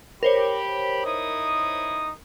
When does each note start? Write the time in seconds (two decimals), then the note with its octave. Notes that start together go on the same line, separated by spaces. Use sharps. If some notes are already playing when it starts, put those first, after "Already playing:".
0.23 G4 A#4 C5 C#5 B5
1.05 D#4 E4 D#6